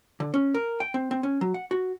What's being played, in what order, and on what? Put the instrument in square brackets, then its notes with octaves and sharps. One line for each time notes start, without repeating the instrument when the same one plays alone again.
[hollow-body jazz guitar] D3
C#4
A#4
G5
C4
C4
C#4
F#3
F#5
F#4